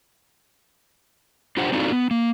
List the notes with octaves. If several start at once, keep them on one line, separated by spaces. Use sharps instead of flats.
D4 F4 G4 C5 F#5
C4 D4 D#4 F4 F#4 A4
B3
A#3